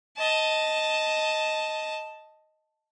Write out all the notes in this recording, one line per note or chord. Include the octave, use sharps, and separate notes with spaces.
D#5 A5